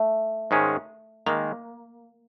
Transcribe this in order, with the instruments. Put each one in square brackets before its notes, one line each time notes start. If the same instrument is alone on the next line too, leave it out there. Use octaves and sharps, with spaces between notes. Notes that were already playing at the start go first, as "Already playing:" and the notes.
Already playing: [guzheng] A3
[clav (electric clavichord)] G#2 D#3 G#3 C#4
[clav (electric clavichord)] D#3 G#3 [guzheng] A#3